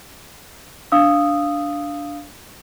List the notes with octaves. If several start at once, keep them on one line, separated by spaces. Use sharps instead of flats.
D4 F5 D#6 E6